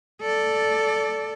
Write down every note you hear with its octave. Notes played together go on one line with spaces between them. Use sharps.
A4 D5